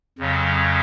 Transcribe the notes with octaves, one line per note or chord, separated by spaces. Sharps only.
F2 C#3 F#3